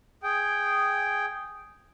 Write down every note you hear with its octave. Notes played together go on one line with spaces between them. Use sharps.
G#4 G5